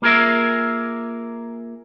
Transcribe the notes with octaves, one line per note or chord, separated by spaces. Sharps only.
A#3 F4 G#4 A#4 E5